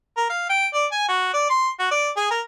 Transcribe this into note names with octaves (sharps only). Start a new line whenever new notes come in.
A#4
F5
G5
D5
G#5
F#4
D5
C6
F#4
D5
G#4
A#4